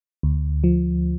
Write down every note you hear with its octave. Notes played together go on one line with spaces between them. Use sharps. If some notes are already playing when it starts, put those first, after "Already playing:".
D2
F3